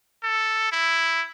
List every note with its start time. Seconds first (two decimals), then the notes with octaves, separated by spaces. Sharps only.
0.24 A4
0.72 E4